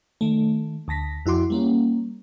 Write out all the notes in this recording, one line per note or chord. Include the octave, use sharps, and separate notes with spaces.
D#3 A3
D2 A5 A#6 B6
F2 E4 F#4 C6 D6
G3 A#3 C#4